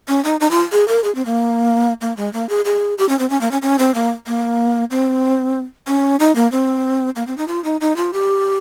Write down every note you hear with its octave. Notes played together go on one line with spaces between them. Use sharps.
C#4
D#4
D#4
F4
G#4
A#4
G#4
C4
A#3
A#3
G#3
A#3
G#4
G#4
G4
C#4
C4
C#4
A#3
C#4
C#4
C4
A#3
A#3
C4
C#4
D#4
A#3
C4
A#3
C4
D#4
F4
D#4
D#4
F4
G4